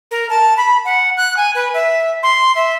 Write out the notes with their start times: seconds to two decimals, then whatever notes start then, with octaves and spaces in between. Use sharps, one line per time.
0.11 A#4
0.30 A5
0.57 B5
0.85 F#5
1.17 F#6
1.37 G#5
1.55 B4
1.74 E5
2.23 C6
2.55 E5